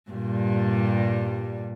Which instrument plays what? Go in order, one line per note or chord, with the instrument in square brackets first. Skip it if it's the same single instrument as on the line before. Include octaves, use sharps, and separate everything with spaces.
[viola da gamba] G2 A#2 G3